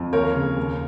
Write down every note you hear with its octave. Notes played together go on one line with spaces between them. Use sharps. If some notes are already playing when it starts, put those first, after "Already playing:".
Already playing: F2
D#2 A#4 C#5
C#3
D#2